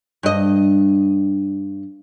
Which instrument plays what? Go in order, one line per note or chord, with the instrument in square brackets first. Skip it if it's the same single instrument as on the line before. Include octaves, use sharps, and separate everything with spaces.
[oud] G2 D#5